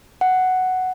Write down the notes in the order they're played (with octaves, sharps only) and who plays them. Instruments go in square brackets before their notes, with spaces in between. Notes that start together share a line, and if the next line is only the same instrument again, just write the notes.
[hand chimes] F#5